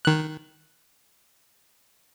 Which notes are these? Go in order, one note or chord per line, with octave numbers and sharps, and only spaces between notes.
D#3 F#6